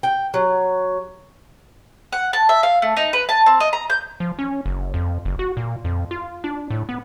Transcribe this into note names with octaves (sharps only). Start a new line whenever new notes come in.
G5
F#3
F#5
A5
E5
F5
A3
D#4
B4
A5
C4
D#5
A#5
G6
F3
C#4
F#1
F2
F#1
F#4
A#2
F2
F4
D4
A2
B3